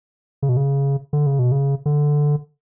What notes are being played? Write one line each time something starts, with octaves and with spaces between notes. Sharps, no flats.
C#3
B2
C#3
D3
C#3
B2
C#3
D3